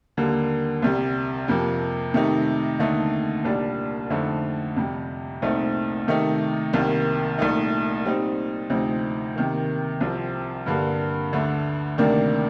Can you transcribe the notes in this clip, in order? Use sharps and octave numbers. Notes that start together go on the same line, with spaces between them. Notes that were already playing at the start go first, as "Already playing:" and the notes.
D#2 D3 G3 A#3
C2 C3 G3
F2 C3 F3 A#3
C3 D#3 A3 D#4
D#2 D3 A3 D#4
C2 A#2 G3 D4
F2 D3 A3 C4 D#4
F2 C3 G3
C2 A#2 A3 C4 D#4
C3 D#3 A3 D#4
C2 C3 D#3 A#3
C2 A#2 A3 D#4
A#2 G3 C4 D#4
D2 C3 F3 C4 D#4
C3 D#3 A#3
C2 C3 F3 C4
G2 D3 G3 A#3
D2 D3 A3
D2 C3 D#3 A#3 D4